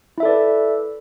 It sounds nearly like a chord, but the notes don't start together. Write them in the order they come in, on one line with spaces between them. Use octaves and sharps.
E4 E5 A4 D5 B4